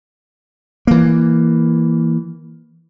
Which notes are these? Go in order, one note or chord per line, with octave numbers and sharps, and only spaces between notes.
E3 A#3